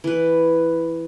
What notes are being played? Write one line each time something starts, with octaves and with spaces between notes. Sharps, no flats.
E3 B4